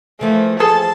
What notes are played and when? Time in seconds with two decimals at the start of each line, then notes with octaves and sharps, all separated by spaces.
0.21 E3 F3 A3 A#3
0.60 G#4 A4 A5